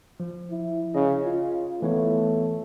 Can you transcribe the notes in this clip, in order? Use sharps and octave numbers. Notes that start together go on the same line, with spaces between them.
F3
E4
C#3 D#5
F4
E3 A3 B3 C#5